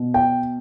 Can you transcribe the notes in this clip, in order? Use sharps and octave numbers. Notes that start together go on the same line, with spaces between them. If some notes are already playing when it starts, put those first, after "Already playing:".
Already playing: B2
G5